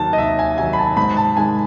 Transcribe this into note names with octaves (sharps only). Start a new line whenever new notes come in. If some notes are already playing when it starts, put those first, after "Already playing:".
Already playing: D#2 D#3 F#3 A5
D#5
D#2 E5
G#5
D#3 F#3 G#5
B5
A5
G#2 B5
A5
D#3 G#3 G#5